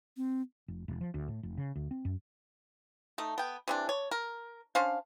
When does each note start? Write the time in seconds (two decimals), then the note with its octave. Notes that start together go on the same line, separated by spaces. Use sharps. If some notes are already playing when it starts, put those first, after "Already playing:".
0.17 C4
0.68 F1
0.88 E1
1.01 F3
1.14 D2
1.28 A2
1.43 F1
1.57 C#3
1.76 D2
1.91 C4
2.05 F#2
3.18 A3 D#4
3.38 B3 G5
3.68 C3 E3 D4
3.89 C#5
4.11 A#4
4.75 C#4 D4 C5 F5